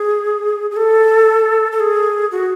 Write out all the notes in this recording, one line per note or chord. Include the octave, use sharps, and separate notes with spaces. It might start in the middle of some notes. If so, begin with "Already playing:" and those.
Already playing: G#4
G#4
A4
A4
G#4
F#4